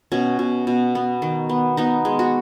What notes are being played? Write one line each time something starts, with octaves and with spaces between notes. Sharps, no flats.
B2 C#4
B2
B2
B3
D#3
B3
B3 D#4
G#3
F#4